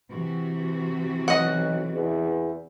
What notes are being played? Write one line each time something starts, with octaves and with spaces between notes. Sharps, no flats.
C3 E3 F#4
B1 D#5 F#5
E2